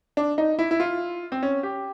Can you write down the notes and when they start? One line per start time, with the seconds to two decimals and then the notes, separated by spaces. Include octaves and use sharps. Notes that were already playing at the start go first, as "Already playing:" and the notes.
0.17 D4
0.38 D#4
0.59 E4
0.71 E4
0.80 F4
1.32 C4
1.43 C#4
1.63 G4